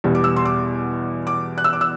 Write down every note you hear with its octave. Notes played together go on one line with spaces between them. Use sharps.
E2 B2 G3
D6
E6
C6
D6
D6
F#6
E6
D6
E6